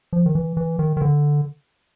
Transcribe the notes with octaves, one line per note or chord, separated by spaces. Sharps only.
F3
D#3
E3
E3
D#3
D#3
D3